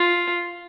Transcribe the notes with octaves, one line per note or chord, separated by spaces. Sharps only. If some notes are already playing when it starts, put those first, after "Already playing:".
Already playing: F4